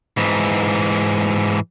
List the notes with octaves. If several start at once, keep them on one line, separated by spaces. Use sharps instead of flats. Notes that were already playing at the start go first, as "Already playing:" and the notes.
G#2 E3